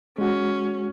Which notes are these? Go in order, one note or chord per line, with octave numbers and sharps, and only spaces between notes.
G#3 C#4 F#4